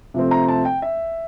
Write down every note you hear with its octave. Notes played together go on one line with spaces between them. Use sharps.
C3 F3 A3 C4
A#5
A5
G5
E5